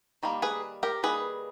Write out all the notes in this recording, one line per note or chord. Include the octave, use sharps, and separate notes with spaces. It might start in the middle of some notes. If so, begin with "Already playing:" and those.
D#3 G3 A#3
G#4 B4
G4 A#4
D#3 G3 A#3 G#4 B4